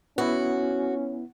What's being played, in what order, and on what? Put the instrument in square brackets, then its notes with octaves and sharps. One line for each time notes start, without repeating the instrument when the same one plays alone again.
[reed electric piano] B3 E4 [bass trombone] C#4 [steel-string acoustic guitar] F#4